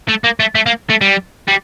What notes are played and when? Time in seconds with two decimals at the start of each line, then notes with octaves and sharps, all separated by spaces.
0.09 A3
0.24 A#3
0.40 A3
0.55 A3
0.66 A#3
0.90 A3
1.01 G3
1.48 G3